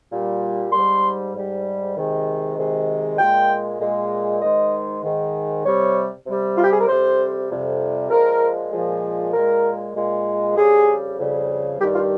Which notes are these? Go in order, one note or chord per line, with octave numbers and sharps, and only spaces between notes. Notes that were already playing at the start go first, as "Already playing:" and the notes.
A#2 G3
G#2 G3 C6
G#2 G3
C3 D#3 G#3
C3 D#3 G#3
A#2 G#3 G5
A#2 G#3
G#2 D#3 G#3 D#5
G#2 D#3 G#3
C3 G3 C#5
C3 G3
F4
G4
G#4
A#4
F2 C3 G3 C5
F2 C3 G3
A#2 F3 G#3 A#4
A#2 F3 G#3
A#2 G#3 A#4
A#2 G#3
F2 C#3 G3 G#4
F2 C#3 G3
G2 D#3 G3 G4
F4